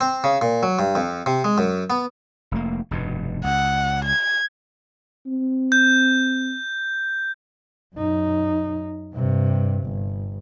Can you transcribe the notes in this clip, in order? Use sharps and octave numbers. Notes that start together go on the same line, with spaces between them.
C4
C#3
A#2
F#3
G2
F2
C3
G#3
F#2
B3
F1 A3 A#3
F1 G2 B2
C#2 F#5
G#6
C4
G6
F#2 D#4
G2 C3
G1